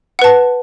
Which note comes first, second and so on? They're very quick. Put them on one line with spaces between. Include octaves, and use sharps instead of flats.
F#5 B4 A5